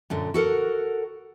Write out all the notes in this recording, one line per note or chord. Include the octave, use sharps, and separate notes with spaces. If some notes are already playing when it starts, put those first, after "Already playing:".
F#2 A#2 D3
F#4 A4 A#4 F#5